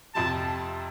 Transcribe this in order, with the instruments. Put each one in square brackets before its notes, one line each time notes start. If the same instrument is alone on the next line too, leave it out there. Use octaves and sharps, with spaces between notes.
[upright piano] F2 C3 F3 [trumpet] A5